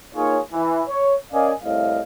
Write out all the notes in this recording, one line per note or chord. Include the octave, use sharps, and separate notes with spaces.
A#3 D#4 F4 G#4 C#5
E3
C#5
C#4 A#4 D5 D#5 F5 G#5
C2 A2 D#5 F5